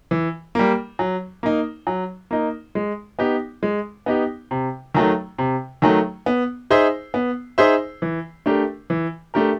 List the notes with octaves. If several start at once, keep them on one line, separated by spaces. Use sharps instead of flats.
E3
G3 A#3
F#3
A#3 D#4
F#3
A#3 D#4
G#3
B3 D#4 G4
G#3
B3 D#4 G4
C3
D#3 F#3 A3
C3
D#3 F#3 A3
B3
D#4 G#4 C5 E5
B3
D#4 G#4 C5 E5
E3
A3 D4 G4 A#4
E3
A3 D4 G4 A#4